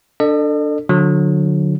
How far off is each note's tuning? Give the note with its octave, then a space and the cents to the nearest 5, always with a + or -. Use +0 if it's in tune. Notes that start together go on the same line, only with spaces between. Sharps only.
D4 +0 A4 +20 D#5 -45
D3 +0 F#3 -30